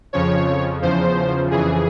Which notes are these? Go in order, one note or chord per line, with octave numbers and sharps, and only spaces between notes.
F2 C#3 F3 C#5
E2 C#3 F3 C5
F2 C#3 E3 G#4